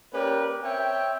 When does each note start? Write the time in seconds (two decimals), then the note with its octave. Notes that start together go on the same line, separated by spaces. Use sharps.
0.14 A#3 C#4 G4 A#4 B4 D5
0.63 C4 C#5 E5 G5